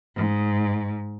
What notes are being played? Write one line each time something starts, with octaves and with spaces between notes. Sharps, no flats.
G#2